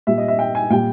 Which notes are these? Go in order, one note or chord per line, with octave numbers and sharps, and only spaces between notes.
A#2 G3 E5
D#5
E5
G5
G#5
A#2 G3 G5